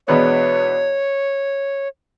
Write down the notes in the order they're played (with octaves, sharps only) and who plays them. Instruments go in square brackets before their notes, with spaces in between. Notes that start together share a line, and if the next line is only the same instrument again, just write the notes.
[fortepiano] E2 B2 G#3 B3 D4 [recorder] C#5